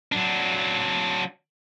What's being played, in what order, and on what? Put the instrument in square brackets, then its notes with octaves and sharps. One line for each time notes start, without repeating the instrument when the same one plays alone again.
[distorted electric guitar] F#3 D4